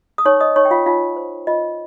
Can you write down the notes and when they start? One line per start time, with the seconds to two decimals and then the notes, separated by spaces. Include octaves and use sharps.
0.18 D#6
0.25 D#4 C#5 C#6
0.40 D#5 D#6
0.56 D#4 C#5 C#6
0.65 G5
0.71 F4 F5
0.86 D#4 F4 F5
1.17 C5
1.47 F4 D#5